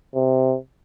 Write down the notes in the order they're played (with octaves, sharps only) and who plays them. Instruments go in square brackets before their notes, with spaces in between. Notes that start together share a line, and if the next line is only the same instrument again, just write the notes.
[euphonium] C3